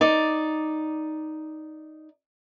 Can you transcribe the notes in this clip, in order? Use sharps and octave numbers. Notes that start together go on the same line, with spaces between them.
D#4 D5